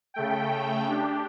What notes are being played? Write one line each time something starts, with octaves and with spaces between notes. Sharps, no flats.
C#3 A3 G5
D4 G4